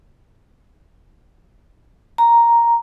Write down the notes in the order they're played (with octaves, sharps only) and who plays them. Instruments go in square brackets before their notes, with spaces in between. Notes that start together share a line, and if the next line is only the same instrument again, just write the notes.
[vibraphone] A#5